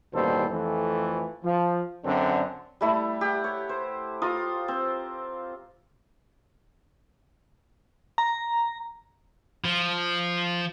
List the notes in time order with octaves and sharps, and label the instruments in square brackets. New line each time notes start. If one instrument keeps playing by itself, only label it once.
[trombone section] A1 D#2 B2 G3 A4 C5
F2 E3 A3
F3
F#2 D3 C4
[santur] G3 A3 E4
G4 F#5
C#5
C5
F4 A#5 D#6
C4
[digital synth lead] A#5
[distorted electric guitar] F3